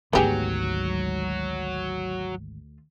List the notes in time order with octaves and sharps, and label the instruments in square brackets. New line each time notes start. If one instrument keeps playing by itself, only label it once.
[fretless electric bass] G#1 G#2 [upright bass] D2 F4 [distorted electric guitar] F#3 [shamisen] B3 G4 G#4